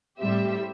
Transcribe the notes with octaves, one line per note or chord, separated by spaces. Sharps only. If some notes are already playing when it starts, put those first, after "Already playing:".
A2 G3 C4 G4 E5